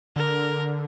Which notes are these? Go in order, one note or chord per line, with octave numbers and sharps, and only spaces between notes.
D3 A#4